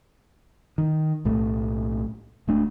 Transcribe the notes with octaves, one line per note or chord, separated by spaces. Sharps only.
D#3
B1 A2 A3
D1 A3 D4